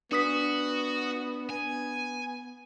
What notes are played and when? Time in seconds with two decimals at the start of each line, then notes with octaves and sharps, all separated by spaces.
0.12 B3 D4 F#4 D#6 B6
1.50 B3 G#5